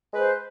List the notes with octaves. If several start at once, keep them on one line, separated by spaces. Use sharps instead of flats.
G#3 B4 C5